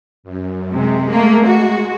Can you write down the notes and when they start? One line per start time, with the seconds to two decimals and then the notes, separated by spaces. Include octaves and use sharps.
0.24 F#2
0.72 C3 G#3
1.09 A3 A#3
1.46 F#4